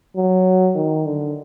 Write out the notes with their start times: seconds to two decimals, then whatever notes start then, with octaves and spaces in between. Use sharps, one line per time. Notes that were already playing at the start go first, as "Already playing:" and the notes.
0.16 F#3
0.76 D#3
1.06 D3